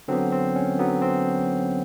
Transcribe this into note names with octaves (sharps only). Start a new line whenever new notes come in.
D3 F#3 B3 C4
C4
C#4
D3 F#3 B3
C4